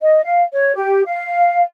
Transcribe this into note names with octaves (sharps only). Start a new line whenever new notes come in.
D#5
F5
C#5
G4
F5